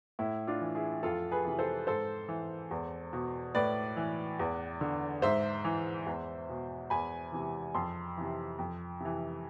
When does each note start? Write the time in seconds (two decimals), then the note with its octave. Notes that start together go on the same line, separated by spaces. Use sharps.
0.19 A2 E4
0.47 D4 F4
0.61 E3
0.75 E4 G#4
1.03 F2 F4 A4
1.31 G#4 B4
1.45 C3 E3
1.59 A4 C5
1.87 G#2 A4 C5
2.28 E3
2.71 E2
3.13 B2
3.55 A2 B4 D5
3.97 E3
4.39 E2
4.81 D3
5.22 G#2 C5 E5
5.64 E3
6.06 E2
6.49 B2
6.90 E2 G#5 B5
7.32 C3 E3
7.75 F2 A5 C6
8.17 C3 E3
8.59 F2
9.00 C3 E3